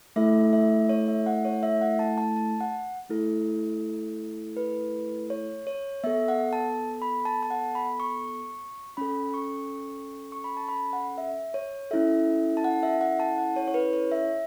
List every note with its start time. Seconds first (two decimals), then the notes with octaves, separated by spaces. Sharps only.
0.16 A3 E4 A4 E5
0.53 E5
0.89 C#5
1.08 E5
1.26 F#5
1.45 C#5
1.63 E5
1.81 F#5
1.99 A5
2.18 A5
2.36 A5
2.61 F#5
3.09 A3 E4 A4
4.57 B4
5.30 C#5
5.67 C#5
6.04 B3 A4 E5
6.28 F#5
6.53 A5
7.02 B5
7.25 A5
7.43 A5
7.50 F#5
7.75 B5
8.00 C#6
8.97 C#4 A4 B5
9.34 C#6
10.32 C#6
10.44 B5
10.57 A5
10.68 B5
10.93 F#5
11.18 E5
11.54 C#5
11.91 C#4 E4 A4 E5
12.57 A5
12.64 F#5
12.83 E5
13.01 F#5
13.20 A5
13.38 F#5
13.56 C#5
13.68 C#5
13.74 B4
13.93 C#5
14.12 E5